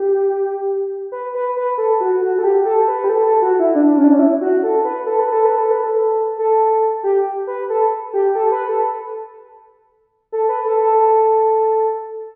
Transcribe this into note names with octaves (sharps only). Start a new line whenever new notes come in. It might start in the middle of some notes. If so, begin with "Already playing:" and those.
Already playing: G4
B4
B4
B4
A4
F#4
F#4
A4
G4
A4
B4
G4
A4
A4
F#4
E4
D4
C#4
D4
C#4
E4
F#4
A4
B4
A4
B4
A4
B4
A4
B4
A4
A4
G4
B4
A4
G4
A4
B4
A4
A4
B4
A4
A4